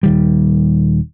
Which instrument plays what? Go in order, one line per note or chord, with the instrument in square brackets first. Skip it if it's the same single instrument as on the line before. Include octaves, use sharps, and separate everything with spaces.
[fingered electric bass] D#1 D#3 G3